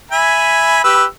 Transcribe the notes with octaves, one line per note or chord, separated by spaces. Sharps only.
E5 G#5 B5
G4 B4 E6